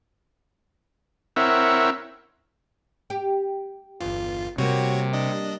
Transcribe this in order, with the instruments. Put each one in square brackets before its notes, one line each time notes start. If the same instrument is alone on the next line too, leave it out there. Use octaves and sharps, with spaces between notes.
[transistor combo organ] C4 E4 A#4 C#5 E5 F#5
[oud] G4
[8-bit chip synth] G1 F4 [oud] E2
[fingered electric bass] C3 [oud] G3 A#3 [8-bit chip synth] F#4 C#5
[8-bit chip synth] D4 D#5